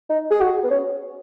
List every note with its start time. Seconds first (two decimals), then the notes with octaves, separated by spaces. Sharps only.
0.10 D#4
0.31 G#4
0.41 F#4
0.64 B3
0.71 C#4